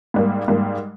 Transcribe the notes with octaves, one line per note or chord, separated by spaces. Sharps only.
G#2 G3 A#3
G#2 G3 A#3